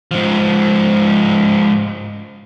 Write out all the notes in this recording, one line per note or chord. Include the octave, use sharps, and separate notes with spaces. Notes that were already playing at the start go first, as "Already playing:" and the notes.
G#2 F3